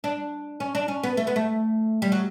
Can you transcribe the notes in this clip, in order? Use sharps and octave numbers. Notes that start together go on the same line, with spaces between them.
D4
C#4
D4
C#4
B3
A3
B3
A3
G3
F#3